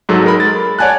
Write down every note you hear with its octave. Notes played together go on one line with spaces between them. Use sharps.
G#2 F#3 A4
G#3 A#4 B5
A6
C#5 D5 F#5 G#5 A5 F#6